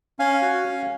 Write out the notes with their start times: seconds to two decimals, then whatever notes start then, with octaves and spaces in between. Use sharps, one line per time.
0.19 C#4 F5 G#5
0.42 F#4
0.64 C#4